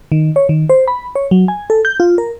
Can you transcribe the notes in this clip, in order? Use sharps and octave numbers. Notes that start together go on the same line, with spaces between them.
D#3
C#5
D#3
C5
B5
C#5
F#3
G#5
A4
G6
F4
A#4